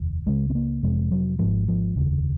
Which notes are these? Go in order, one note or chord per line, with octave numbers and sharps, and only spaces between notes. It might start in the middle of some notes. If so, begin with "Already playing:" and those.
Already playing: F1 D#2
C#2 C#3 G#3
C4
A#3
F1 F2 C3 G#3
F#3
G#1 G#2 F3
F3
F1 D#2 C#3